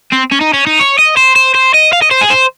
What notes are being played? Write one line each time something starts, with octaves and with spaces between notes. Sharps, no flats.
C4
C#4
D#4
C#4
D#4
C#5
D#5
C5
C5
C5
D#5
F5
D#5
C5
G#4
C5